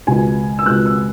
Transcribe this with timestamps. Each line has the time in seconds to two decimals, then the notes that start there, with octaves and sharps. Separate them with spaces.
0.07 C#2 B2 G#3 G#5
0.59 E6
0.66 C#2 B2 G#3 F#6
0.86 E6